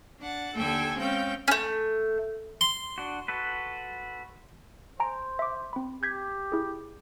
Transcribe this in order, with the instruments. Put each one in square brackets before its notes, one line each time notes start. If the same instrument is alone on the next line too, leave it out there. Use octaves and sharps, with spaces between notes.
[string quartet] D4 F#5 A6
D#2 D3 A4 E5 G5 G#5
G#3 C4 C#4 F5 G5 G6
[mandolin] A3 C#4
[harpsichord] C6
[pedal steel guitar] D4 F#4
F#4 A4 B4
[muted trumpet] C5 [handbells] G#5 A#5 D7
[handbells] E5 D6
C4 B5
[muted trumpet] G4 [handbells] G6 G#6 B6
[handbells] E4 G#4